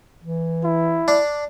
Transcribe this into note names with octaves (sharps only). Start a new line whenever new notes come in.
E3
E4
D4